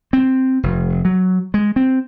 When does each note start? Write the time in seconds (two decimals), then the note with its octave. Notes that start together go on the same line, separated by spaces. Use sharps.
0.13 C4
0.63 F1
1.05 F#3
1.54 G#3
1.76 C4